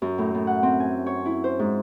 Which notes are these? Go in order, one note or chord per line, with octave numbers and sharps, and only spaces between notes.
F#2
A2
A2
F#5
C4
G#5
C#5
E4
C5
G#2